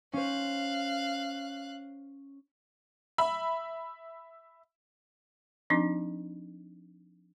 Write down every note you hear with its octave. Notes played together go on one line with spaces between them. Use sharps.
C#4 C5 F5 F#6
E5 B5
F3 C4 D4 D#4